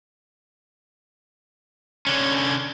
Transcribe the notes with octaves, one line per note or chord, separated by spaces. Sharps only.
D3 C#4